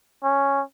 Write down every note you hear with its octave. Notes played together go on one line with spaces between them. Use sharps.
C#4